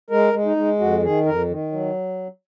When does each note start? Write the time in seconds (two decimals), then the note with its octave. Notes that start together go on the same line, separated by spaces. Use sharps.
0.10 G#3 A#4
0.33 G#3
0.45 D#4
0.56 G#3
0.79 F2 F#4
1.03 D#3 G#4
1.26 F2 A#4
1.49 D#3
1.72 F#3